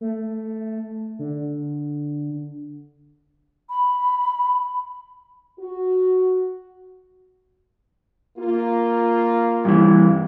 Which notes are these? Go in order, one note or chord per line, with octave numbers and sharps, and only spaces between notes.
A3
D3
B5
F#4
A#3 F4
G2 E3